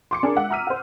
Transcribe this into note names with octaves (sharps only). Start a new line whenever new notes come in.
C6 D6 C#7
D4 G#4 A#4
G#3 E5 F#5
A#5 E6 F6 B6 D#7
C5 F#5